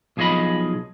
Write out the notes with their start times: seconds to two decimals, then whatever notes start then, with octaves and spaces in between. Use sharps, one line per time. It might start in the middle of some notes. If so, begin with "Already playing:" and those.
0.17 B1 F3 G#4 C5 D#5 B5